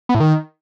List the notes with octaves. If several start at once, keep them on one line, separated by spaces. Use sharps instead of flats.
B3
A2
D#3